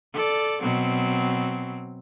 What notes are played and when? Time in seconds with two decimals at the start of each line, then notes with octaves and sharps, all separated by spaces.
0.13 A4 D5
0.62 B2 F#3 C4